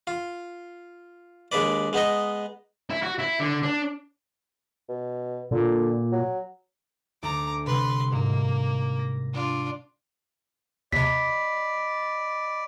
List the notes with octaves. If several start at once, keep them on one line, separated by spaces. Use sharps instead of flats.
F4
D#2 G#3 D4 B4 D5
G#3 B3 D#4 D#5
E4
F#4
E4
D3
D4
B2
A#2 D3
F#3
D2 A#5 D6
C3 G3 B4 C6
G#2 A#3
A#6
D4 F4
D#2 C3 D5 D#5 B5 B6